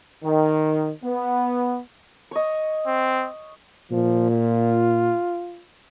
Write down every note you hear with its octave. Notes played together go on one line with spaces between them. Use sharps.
D#3
B3
C#5 D#5
C4
A#2 F3
F4